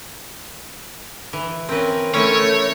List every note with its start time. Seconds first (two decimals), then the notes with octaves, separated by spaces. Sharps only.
1.33 E3
1.69 C4 C#4 A#4 B4
2.14 A3 C#4 E4 A#4 C#5 G#5